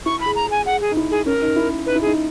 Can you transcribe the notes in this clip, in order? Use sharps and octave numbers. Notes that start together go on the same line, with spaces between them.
E4 C#6
B5
G#4
A#5
G#4
G#5
G#4 F#5
G#4
D#4
E4
G#4
C#4 A#4
D#4
E4
D#4 B4
E4
D#4 G#4